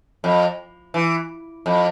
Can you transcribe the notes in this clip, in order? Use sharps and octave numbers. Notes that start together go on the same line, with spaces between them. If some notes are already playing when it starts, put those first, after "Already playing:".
F2
E3
F2